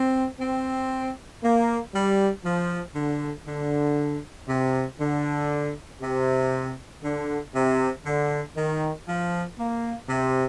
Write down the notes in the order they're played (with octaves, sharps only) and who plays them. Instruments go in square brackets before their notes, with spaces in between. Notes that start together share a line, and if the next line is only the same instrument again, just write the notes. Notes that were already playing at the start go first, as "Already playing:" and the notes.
Already playing: [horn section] C4
C4
A#3
G3
F3
D3
D3
C3
D3
C3
D3
C3
D3
D#3
F3
A#3
C3